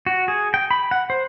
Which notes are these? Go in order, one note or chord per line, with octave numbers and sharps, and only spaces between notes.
F#4
G#4
G5
B5
F#5
C5